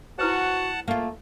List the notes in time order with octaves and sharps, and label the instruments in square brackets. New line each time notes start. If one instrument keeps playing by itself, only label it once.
[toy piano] E4 B4 C5 [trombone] F#4 [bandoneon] F#5 A5
[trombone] A3 [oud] A#3 F4